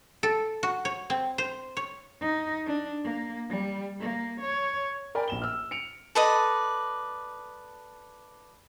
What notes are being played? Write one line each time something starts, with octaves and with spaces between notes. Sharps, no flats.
A4
F#4
C#5
C4
C5
C#5
D#4
D4
A#3
G3
A#3
C#5
A#4 D5 G5 G#5 B5
A#1 E7 G7
E6 F6
C#7 D7 F7
A4 B4 D5 D#5